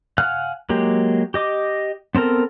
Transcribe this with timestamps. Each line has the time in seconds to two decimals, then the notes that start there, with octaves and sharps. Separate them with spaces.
0.18 F5 F#5 G#5 F6 F#6
0.69 F#3 G#3 A#3 G4
1.34 G4 D#5 D6
2.15 B3 C4 A4 A#4